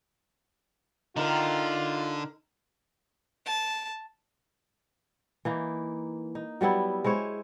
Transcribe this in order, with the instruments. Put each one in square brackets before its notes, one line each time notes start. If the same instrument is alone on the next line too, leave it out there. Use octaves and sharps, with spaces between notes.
[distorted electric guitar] D3 [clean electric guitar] D#4 A#4 [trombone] F4
[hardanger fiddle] A5
[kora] E3 A#3 D#4
D#4
F#3 G3 B3 E4
G#3 E4 C5 C#5